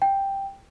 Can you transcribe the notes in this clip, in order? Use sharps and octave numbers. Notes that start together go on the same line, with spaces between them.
G5